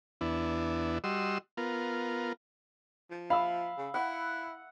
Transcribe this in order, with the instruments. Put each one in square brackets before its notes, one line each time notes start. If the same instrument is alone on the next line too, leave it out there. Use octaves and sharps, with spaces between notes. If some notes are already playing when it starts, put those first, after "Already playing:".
[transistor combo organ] E2 B3 D4 E4
G3 F#4 D#5 C6 E6
B3 F4 A#4
[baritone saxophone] F3
[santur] E5 B5 [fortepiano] F5
[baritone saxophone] C#3
[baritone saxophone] E4 [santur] F#5